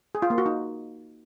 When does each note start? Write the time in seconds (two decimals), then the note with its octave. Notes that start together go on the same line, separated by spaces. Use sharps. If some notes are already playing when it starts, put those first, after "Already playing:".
0.15 G#4
0.22 F4
0.30 A#3
0.38 F#4
0.46 D#4